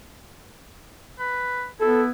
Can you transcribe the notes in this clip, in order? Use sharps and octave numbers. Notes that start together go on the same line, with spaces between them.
B4
B3 E4 A4